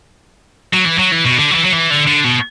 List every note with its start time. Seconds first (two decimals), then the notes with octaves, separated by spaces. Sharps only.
0.74 F#3
0.85 E3
0.99 F#3
1.12 E3
1.25 B2
1.38 D3
1.51 F#3
1.55 E3
1.65 F#3
1.72 E3
1.91 D3
2.07 D3
2.24 B2